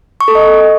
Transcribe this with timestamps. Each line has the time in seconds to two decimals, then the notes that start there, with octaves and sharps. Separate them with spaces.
0.21 C#6
0.28 A4
0.35 D#5